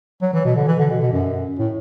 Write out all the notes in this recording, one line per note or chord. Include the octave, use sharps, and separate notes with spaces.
F#3
E3
B2
D3
E3
D3
B2
B2
F#2
A2